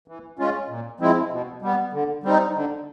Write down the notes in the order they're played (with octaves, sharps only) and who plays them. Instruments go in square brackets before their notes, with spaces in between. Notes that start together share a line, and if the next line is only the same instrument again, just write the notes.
[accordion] E3
G#3 C#4 F4
A#2
F3 G#3 C4 E4
B2
G3 B3
D3
G3 C4 D#4
D3